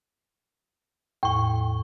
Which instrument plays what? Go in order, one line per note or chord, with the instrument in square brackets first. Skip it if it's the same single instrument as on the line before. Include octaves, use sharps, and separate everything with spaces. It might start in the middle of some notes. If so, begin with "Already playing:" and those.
[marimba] E2 A2 [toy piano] G5 C#6